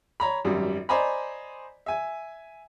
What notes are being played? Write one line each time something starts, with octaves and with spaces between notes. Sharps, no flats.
C#5 A#5 B5
G#1 F#2 G3
C5 D5 D#5 G#5 A#5 B5
E5 G#5